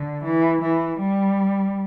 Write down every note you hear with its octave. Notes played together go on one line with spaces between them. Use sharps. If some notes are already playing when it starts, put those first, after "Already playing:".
Already playing: D3
E3
E3
G3